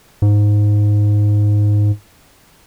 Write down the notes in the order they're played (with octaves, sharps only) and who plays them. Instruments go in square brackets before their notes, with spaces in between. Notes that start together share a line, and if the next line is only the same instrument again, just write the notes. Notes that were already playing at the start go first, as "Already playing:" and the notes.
[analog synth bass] G#2